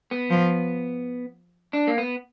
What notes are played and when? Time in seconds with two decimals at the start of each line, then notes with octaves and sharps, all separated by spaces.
0.11 B3
0.30 F3
1.73 D4
1.87 A#3
1.98 B3